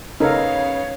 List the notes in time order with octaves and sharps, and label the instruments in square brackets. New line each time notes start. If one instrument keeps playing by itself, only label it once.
[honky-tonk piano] C#3 B3 [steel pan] D#4 A4 A#4 [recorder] C#5 [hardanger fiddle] F5